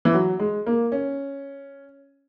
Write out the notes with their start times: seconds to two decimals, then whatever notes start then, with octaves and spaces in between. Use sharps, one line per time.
0.05 E3
0.14 F#3
0.39 G#3
0.67 A#3
0.92 C#4